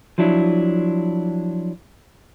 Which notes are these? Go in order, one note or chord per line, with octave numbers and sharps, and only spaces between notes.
F3 F#3 D4 E4